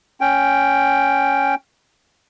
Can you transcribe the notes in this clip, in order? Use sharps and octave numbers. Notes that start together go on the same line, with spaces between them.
C#4 G5